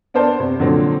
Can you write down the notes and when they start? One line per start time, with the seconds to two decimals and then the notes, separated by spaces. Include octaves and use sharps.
0.14 B3 D4 A#4 C5 A5
0.40 C3
0.59 A#2 D3 F3 F#3 C4